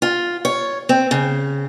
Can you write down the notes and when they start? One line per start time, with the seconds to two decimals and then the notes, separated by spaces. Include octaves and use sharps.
0.02 F4
0.45 C#5
0.89 C4
1.11 C#3